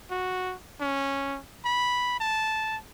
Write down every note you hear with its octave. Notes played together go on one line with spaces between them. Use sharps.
F#4
C#4
B5
A5